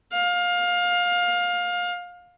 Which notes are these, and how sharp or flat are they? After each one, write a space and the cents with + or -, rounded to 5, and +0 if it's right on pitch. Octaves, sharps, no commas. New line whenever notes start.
F5 +25